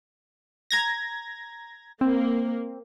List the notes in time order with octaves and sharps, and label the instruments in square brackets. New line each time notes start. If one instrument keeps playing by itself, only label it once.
[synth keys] A#5 G#6 A#6
[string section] A#3 [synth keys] C4